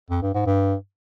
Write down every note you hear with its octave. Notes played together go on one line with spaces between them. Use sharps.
F2
G2
G#2
G2